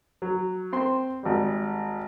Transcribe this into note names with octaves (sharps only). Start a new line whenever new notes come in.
F#3
C4 C6
G#1 G3